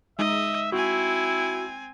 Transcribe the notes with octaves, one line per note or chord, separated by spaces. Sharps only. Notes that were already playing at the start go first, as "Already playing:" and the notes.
G#3 D#4 D#5 E5
C4 E4 F#4 G#5